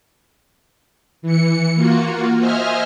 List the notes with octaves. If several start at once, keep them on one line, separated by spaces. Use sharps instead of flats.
E3 C#7
A#3 F4 F#4
C5 D#5 E5 G#5 F6